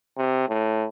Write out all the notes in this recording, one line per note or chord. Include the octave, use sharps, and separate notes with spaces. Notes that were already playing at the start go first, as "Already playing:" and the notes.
C3
A2